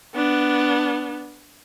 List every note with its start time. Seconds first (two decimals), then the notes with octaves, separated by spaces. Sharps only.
0.15 B3 D4